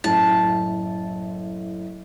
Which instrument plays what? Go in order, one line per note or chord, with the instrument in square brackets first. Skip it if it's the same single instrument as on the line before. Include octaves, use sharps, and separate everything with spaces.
[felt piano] F#1 A2 [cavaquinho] A5